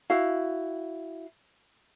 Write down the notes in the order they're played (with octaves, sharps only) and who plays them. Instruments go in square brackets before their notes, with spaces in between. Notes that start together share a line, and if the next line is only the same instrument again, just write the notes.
[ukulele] E4 F#4 F5